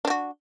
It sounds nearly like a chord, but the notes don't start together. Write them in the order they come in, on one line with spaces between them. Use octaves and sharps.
D4 C4 F#4